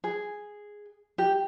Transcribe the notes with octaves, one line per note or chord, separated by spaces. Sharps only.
G#4
G4